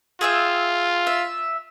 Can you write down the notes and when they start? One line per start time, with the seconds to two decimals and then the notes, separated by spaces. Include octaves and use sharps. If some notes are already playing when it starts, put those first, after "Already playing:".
0.21 F4 G#4 E5 G5
1.07 E5